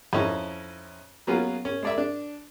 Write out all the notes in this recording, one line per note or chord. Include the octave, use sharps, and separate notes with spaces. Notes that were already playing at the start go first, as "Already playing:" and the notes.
F2 C#4 D#4 E4 C#6
F#3 A#3 B3 C#4 F4 G#4
C#4
G#3 D5 E5
D4